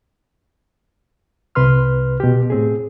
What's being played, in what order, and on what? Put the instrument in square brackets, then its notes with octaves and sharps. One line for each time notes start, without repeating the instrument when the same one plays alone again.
[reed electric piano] C2 C3 B4 C6 F6
B2 G4
A2 C4 G#4